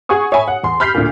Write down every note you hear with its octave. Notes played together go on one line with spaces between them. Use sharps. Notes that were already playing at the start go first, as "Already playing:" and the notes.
G#4 F#5 G#5 C#6 D#6
C#5 E5 G#5 B5
F#5
E2 C6
B5 F6 G6 B6 C7
D2 A#2